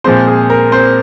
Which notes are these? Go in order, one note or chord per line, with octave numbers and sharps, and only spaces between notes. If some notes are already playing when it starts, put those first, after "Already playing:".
A#2 F3 G#3 C4 C5
G#4
A#4
C4 C5